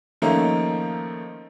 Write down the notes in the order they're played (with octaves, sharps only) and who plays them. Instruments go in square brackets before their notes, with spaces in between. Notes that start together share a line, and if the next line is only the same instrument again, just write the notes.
[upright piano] D#3 F3 A3 A#3 C#4 D#4